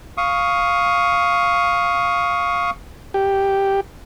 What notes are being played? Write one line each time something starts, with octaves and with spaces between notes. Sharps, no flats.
F5 C#6 D#6
G4